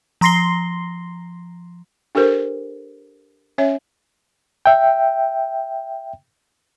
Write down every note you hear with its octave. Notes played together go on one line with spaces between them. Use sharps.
F3 A#5 C6 A#6 C7 G7
D4 G4 A4 A#4 C5
C#4 C#5 E5
E5 G5